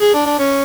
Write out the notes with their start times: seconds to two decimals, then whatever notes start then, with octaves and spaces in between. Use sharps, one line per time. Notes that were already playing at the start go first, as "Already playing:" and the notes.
0.01 G#4
0.14 D4
0.26 D4
0.39 C#4